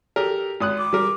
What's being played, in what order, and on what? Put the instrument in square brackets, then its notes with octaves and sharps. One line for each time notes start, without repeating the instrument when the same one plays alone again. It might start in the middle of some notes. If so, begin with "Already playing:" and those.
[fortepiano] G4 A4 A#4
G#1 D#6 F#6
[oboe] D6
[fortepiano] G3 A#4